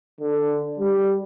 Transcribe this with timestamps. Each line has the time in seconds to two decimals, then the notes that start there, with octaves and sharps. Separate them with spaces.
0.20 D3
0.79 G3